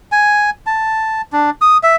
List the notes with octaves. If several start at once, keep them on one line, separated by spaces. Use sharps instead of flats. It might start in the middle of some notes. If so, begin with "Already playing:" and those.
G#5
A5
D4
D#6
E5